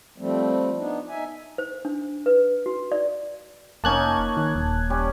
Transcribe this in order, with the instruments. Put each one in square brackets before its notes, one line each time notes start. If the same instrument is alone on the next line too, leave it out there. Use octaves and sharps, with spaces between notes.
[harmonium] F3 G3 A3 C4
B3 D4 D#4
D#4 E5 G#5
[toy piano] C5
D4
B4
F#4
D5
[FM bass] F1 [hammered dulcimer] A#3 C#4 D#4 [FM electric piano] A5 F#6 G#6
[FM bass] D#3 [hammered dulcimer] D6
[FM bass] D#1
[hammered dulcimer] G3 C#4